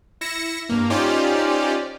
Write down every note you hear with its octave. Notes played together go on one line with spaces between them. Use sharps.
E4 A#6 C#7 E7
G2 A#3
C#4 D#4 F4 G4 C5 D5